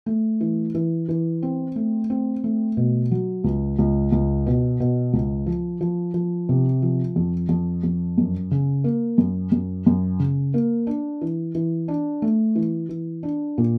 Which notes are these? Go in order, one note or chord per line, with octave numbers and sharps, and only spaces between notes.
A3
E3
E3
E3
C4
A3
C4
A3
B2
F#3
C#2
C#2
C#2
B2
B2
C#2
F3
F3
F3
C3
F3
F2
F2
F2
F#2
C#3
A#3
F#2
F#2
F#2
C#3
A#3
D4
E3
E3
D4
A3
E3
E3
D4
A#2